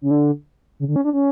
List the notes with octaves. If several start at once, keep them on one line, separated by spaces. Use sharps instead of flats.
C#3
D3
C#3
D3
C#4
D4
C#4